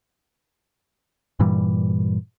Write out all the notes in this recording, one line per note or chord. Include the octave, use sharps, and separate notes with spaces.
G2 A#2 E3 G3